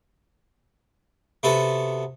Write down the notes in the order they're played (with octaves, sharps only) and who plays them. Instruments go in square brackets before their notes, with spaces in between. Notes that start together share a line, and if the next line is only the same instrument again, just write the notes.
[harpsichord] C3 B3 F#4 A4